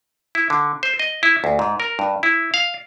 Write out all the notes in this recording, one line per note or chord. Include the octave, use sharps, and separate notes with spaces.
E4
D3
C5
D#5
E4
D2
G#2
A#4
G2
E4
F5